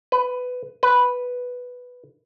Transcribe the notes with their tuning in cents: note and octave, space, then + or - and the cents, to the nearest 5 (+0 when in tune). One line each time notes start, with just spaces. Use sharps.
B4 +15
B4 +0